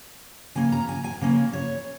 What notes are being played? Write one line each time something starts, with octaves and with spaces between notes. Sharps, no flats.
C#3 A#3 C#4 G#5
A#5
G#5
G#5
C#3 A#3 C#4
C#5